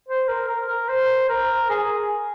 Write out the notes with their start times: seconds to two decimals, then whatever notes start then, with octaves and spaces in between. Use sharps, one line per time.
0.08 C5
0.29 A#4
0.48 A#4
0.68 A#4
0.89 C5
1.29 A#4
1.70 G#4